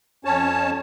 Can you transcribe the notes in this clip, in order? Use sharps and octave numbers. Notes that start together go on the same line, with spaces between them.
F2 C#4 C#5 A5